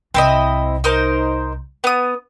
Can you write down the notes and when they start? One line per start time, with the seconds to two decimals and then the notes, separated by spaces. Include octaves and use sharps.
0.14 C2 C4 E4 D#5
0.84 D#4 A#4 C5
1.84 B3 D#6